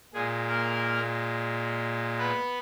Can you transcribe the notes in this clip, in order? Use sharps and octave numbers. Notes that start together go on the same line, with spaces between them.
A#2 G#3 G#4
A#3 A#4
B3 B4